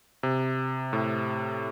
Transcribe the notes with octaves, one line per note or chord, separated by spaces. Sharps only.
C3
A2